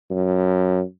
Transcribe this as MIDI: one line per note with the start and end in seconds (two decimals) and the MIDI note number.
0.11 0.81 42